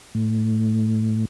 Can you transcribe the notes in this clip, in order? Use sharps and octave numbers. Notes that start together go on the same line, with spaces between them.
A2